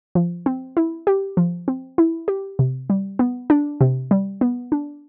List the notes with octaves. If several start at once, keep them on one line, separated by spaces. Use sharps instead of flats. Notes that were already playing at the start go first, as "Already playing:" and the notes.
F3
C4
E4
G4
F3
C4
E4
G4
C3
G3
B3
D4
C3
G3
B3
D4